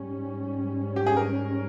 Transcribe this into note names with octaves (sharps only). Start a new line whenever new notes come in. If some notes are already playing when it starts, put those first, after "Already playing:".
Already playing: G#2 G3 C#4
G4
G#4
A#4